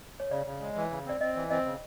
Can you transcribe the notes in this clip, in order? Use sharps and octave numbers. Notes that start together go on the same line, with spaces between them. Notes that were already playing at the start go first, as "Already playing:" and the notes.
C#5
C#3 D5
C#3
G#3
E3
C#3
C4 D5
C4 D#5
E3
C4 D#5
C#3